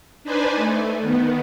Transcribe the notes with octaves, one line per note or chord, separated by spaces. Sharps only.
D4 D#4 B4 C5 D5 G#5
A3
D#3 B3